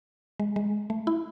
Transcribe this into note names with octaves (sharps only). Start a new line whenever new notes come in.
G#3
G#3
A3
E4